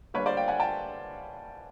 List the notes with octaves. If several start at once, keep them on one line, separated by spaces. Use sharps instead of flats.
D3 G3 A#3 B4 C#5
C5 D5
F5 G5
F#5 G#5
G5 A5